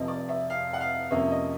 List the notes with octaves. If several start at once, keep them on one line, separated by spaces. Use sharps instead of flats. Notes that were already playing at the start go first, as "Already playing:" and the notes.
Already playing: F1 F2 C3 F3 D#5
D5
E5
F5
F#5
F5
F2 C3 F3 A#3 C#4 E5
D#5